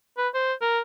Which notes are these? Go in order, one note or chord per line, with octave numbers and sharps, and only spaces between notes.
B4
C5
A#4